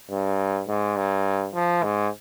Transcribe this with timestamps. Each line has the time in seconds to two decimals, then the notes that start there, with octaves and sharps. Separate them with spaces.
0.10 G2
0.68 G#2
0.97 G2
1.54 F3
1.83 G#2